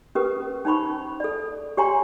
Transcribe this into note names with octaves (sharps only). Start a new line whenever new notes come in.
C#4 G4 A#4 B4 D#6
C#4 D#4 C5 B5 C#6
A4 D5
G4 C#5 G#5 A#5 C6